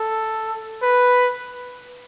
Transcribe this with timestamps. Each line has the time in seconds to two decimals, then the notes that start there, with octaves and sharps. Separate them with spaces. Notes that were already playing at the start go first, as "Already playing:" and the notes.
Already playing: A4
0.82 B4